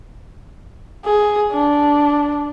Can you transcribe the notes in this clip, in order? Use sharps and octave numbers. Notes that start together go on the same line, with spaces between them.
G#4
D4